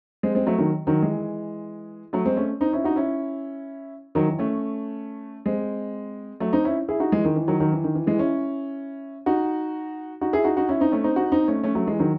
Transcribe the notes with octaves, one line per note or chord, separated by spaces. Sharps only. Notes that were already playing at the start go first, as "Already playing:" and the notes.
G#3 C4
G#3 C4
F#3 A3
D#3 F#3
D#3 F#3
E3 G#3
F#3 A3
G#3 C4
A3 C#4
C4 D#4
C#4 E4
D#4 F#4
C#4 E4
D#3 F#3
E3
A3 C#4
G#3 C4
F#3 A3
C4 D#4
C#4 E4
E4 G#4
D#4 F#4
E3 G#3
D#3
E3
D#3 F#3
D#3 F#3
E3
D#3
E3
E3 G#3
C#4 E4
D#4 F#4
D#4 F#4
E4 G#4
D#4 F#4
D#4 F#4
C#4 E4
C4 D#4
A3 C#4
C4 D#4
D#4 F#4
C4 D#4
A3 C#4
A3 C#4
F#3 A3
E3 G#3
D#3 F#3